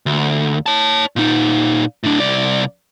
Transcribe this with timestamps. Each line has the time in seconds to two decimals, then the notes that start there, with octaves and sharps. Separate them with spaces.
0.06 D2
0.66 C#5 A5
1.16 A#2 D#4
2.03 A2 D4
2.20 C2 D5